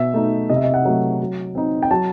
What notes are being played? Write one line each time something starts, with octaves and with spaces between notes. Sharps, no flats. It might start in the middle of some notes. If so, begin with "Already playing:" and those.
Already playing: B2 E5
A3 D#4
C3 D#5
E5
D#5
F#5
F#3 A3
F#3
C4 D#4
G5
F#3 A5